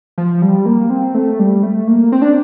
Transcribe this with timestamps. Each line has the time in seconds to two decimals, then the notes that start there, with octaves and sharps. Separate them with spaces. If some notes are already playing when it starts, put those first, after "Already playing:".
0.18 F3
0.42 G3
0.66 A#3
0.90 C4
1.15 A3
1.39 G3
1.63 A3
1.87 A#3
2.12 C4
2.22 D4